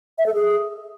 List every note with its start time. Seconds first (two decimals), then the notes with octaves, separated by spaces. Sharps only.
0.18 E5
0.26 A4
0.34 G#4